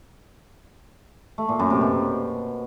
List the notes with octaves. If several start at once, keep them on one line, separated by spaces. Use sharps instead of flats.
A3
A#2
F#2
C3
B2